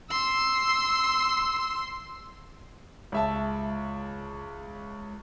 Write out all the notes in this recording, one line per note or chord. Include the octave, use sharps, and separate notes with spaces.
C6 E6
C#2 E5 A5